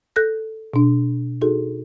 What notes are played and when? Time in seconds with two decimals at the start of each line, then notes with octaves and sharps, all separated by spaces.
0.16 A4 F#6 G6 A#6
0.74 B2 D4
1.41 D#4 F#4 G#4 A4